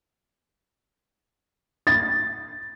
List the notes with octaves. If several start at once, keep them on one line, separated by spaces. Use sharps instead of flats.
A6